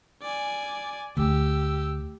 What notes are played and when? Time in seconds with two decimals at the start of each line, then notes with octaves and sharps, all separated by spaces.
0.22 D5 G#5
1.17 D2 A3 G4 E6